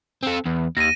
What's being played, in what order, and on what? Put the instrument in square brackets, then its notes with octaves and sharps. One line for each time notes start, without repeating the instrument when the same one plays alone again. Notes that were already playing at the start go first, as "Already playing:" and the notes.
[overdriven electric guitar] C4 A4
E2
[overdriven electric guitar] D#2 [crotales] A#6 D#7